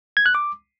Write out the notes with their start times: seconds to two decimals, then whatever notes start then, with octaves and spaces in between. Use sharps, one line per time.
0.17 G#6
0.26 F#6
0.35 D6